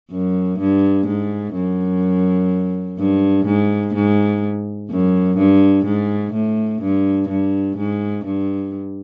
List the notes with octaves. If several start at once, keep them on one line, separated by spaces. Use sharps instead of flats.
F#2
G2
G#2
F#2
G2
G#2
G#2
F#2
G2
G#2
A2
G2
G2
G#2
G2